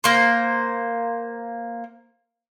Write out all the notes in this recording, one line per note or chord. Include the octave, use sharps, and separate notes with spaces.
A#3 C5